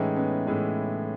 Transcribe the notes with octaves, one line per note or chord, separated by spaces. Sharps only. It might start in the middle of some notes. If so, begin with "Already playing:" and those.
Already playing: A2 E3 G#3 C#4 D#4
B3 C#4
A2 E3 G#3